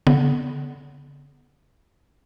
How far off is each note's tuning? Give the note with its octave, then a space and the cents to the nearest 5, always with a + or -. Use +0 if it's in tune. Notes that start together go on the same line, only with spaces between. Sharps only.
D3 -45 B3 +0